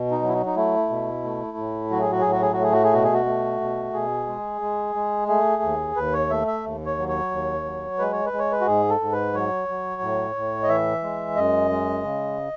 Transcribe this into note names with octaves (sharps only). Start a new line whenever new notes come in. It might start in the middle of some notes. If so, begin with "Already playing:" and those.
Already playing: B2
D#4
F#3
E4
D#4
D#4
A3 E4
B2
A3
A2
F#3 F#4
G#4
F#4
A2 G#4
F#4
G#4
F#4
A3 G#4
F#4
G#4
B2 F#4
G#4
F#4
A3
B2
B2 G#4
G#3
G#3
G#3
A3 G#4
D#2
D#2 B4
C#5
A3 E5
E5
D#2
C#5
F#3
C#5
D#2
F#3
G#3 B4
C#5
B4
G#3
C#5
B4
F#4
G#2 G#4
A4
G#2
B4
F#3 C#5
F#3
A2
A2
D#5
E3 E5
G#3
F#2 D#5
G#3
C#3